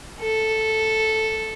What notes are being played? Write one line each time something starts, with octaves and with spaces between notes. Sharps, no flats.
A4